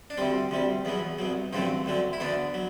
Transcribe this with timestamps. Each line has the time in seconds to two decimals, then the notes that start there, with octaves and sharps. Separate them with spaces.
0.10 D4
0.18 D2 C3 G3 C4
0.51 D2 C3 G3
0.85 E2 B2 F#3 B3
1.19 C2 B2 F#3
1.53 A1 G2 D3 F#3 A3 C4
1.86 D2 D3 F#3 A3
2.13 E4
2.20 D2 D3 A3 B3 D4
2.54 F#3